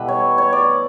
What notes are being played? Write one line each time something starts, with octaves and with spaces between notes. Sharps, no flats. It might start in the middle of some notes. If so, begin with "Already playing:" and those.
Already playing: B2 E3 G3 A3 B4 E5
C#5
C#5
D5